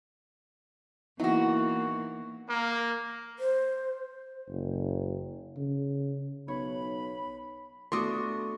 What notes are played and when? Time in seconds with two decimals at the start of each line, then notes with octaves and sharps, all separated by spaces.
1.20 E3 F#3 A#3 B3 D#4 E4 F#4
2.49 A#3
3.39 C5
4.49 F#1
5.57 C#3
6.48 B1 C#5 B5
7.92 A3 B3 D4 F#4 C6 D6 D#6